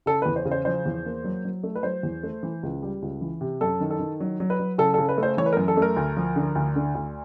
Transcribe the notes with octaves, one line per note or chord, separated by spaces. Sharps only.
C#3 A4
E2 B4
C5
C#3
C5
F3 C5
E2
A#3
F#3
F#3
A3
B4
F#3 C5
E2
A3
E3
C#2
G3
C#2
E3
C3
F#2 A4
D#3
A4
D#3
F#3
F#3
B4
F#3
C#3 A4
C#3 A4
B4
A3
C5
E3 C#5
B4
F#2 A#4
A4
A3 A#4
D2
F3
D3
D2
D3
D2